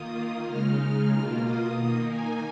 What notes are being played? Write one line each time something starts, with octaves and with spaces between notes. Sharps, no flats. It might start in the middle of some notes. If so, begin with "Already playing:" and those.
Already playing: D#3 A#3 F4 D#6
C#3 G#3 D#4 F6
F6
B2 A#3 F4 F6
D#6
D#3 A#3 D#4
G#5